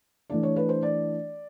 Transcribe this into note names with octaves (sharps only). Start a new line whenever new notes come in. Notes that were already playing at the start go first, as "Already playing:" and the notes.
E3 A3 D4 D5
C#5
B4
C5
D5